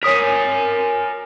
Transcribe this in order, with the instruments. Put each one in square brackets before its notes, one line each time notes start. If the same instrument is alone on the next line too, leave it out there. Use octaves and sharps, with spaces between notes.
[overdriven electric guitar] A#4 G#5 [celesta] C#5 D#6 B6